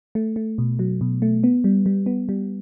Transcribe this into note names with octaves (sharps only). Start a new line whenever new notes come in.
A3
A3
B2
F#3
B2
A3
B3
G3
G3
B3
G3